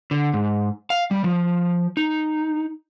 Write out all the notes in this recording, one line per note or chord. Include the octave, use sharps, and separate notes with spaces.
D3
G#2
F5
G3
F3
D#4